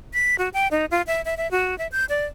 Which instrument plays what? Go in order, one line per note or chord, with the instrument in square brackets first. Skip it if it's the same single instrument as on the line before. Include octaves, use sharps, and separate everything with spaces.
[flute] B6
F#4
G5
D#4
F4
E5
E5
E5
F#4
E5
G6
D5